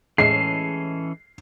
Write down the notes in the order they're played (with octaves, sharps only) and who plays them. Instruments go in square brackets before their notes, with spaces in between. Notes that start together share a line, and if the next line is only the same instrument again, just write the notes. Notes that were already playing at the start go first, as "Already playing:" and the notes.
[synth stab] A2 G#3 [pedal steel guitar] E3 C#4 A4 [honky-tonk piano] C7